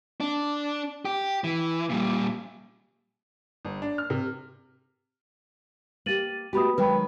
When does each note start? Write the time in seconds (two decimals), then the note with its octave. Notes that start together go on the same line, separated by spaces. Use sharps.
0.20 D4
1.05 G4
1.44 E3
1.90 A#2 G3
3.65 G1
3.82 D4
3.98 F6
4.10 C3
6.06 A#3 G4 A6 D#7 F#7
6.53 A3 B3 F#4 G4 B5 D#6
6.78 D#3 F#3 G#3 B4 G5 B5